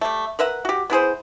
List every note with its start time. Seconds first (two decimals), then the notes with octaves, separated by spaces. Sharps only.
0.01 G3 A3
0.39 A#4 B4 E5 F#5
0.65 F#4 G4
0.90 B3 E4 G#4 C5